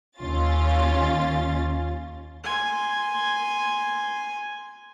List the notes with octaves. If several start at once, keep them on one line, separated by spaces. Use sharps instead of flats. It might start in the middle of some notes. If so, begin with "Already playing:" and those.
D#2 C#4 F4 A6
G#5 C6